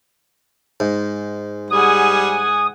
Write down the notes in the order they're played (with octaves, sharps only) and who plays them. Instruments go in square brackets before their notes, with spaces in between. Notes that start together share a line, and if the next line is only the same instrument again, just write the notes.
[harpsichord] G#2
[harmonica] G3 [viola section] G#4 F#5 G#5 [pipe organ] D#6